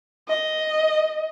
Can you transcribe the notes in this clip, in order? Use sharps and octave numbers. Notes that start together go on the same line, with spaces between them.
D#5